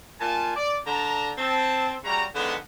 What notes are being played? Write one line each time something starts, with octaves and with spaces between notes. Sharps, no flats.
A#2 F4 G#5 A5
D5
D3 A5 A#5
C4 A5
C#3 G3 F#4 A#5
D3 D#3 F3 G#3 B3